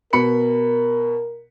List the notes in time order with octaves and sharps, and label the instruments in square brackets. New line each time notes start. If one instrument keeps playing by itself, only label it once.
[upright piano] B2 B5 C#7 [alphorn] A#4